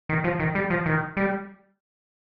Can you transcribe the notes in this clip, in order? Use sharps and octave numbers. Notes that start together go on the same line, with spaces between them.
D#3
F3
D#3
G3
F3
D#3
G3